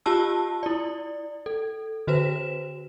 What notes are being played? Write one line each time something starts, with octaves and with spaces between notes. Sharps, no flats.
F4 G4 A5 E6
E4 D5
A4
D3 F#4 B4 C5 E7